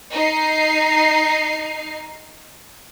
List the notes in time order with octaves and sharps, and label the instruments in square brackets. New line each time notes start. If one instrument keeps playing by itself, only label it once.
[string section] D#4 C7